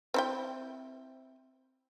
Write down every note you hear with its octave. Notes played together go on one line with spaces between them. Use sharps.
C4 E4 G5